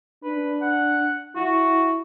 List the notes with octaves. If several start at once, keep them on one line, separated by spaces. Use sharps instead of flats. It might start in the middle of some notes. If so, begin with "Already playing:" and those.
D4 B4
F#5
E4 F#4